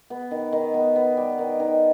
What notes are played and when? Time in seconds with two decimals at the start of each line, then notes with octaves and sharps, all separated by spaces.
0.10 B3
0.31 D#3
0.53 D#3
0.74 B3
0.96 B3
1.17 G3
1.39 D#3
1.60 D#3